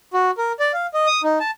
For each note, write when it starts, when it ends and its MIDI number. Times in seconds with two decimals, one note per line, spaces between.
0.13 0.31 66
0.38 0.52 70
0.59 0.72 74
0.73 0.87 77
0.94 1.06 75
1.07 1.22 87
1.23 1.39 63
1.40 1.51 81